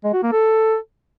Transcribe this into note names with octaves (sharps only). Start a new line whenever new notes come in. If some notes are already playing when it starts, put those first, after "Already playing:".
G#3
F#4
A#3
A4